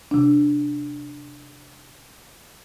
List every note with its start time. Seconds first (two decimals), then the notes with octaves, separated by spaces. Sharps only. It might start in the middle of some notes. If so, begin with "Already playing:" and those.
0.11 C3 D4